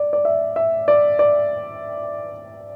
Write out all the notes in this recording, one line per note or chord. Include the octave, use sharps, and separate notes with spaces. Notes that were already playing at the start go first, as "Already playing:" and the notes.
Already playing: D5
D5
E5
E5
D5
D5